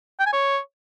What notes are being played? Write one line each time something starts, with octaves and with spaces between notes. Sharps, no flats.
G5
G#5
C#5